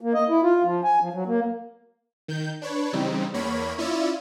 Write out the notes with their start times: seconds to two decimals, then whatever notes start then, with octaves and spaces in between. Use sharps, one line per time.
0.01 A#3
0.14 D#5
0.29 E4
0.43 F4
0.63 F3
0.84 G#5
1.01 F3
1.13 F#3
1.26 A#3
2.28 D#3 G6
2.62 D4 B4 C#5
2.93 C#3 E3 G3 C4 D#4
3.34 E2 A#3 C#5 B5
3.78 C#4 E4 F4 D5 E5